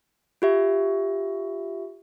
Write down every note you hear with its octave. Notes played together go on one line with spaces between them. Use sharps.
F4 G4 E5